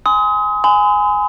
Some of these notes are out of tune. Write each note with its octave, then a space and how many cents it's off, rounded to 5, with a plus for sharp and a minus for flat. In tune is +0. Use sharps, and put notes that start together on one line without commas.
G#5 +0 C6 -35 D#6 +30
G#5 +0 C6 -45